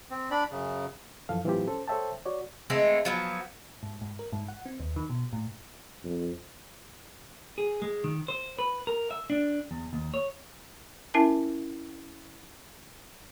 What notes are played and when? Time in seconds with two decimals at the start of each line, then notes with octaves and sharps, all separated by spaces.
0.11 C4
0.31 D4 D5 B5
0.51 F#2 C#3
1.29 F#2 E3 F3 A4 F5
1.44 A2 E3 F#3 C4 F4 G4
1.67 C#4 A4 C5
1.88 A4 C5 C#5 E5 G5 A5
2.26 F#4 C#5 D5
2.70 E3 G#3 A3 C4
3.05 F3 F#3 B3
3.83 G#2
4.01 G#2
4.19 A#4
4.33 G#2
4.48 F#5
4.66 C4
4.80 D#2
4.96 D#3
5.10 B2
5.33 A2
6.05 F2
7.58 G#4
7.82 G#3
8.04 D#3
8.28 C5
8.59 B4
8.87 A#4
9.11 E5
9.30 D4
9.71 E2
9.93 D#2
10.14 C#5
11.14 C#4 E4 A#4 E5 G#5 A5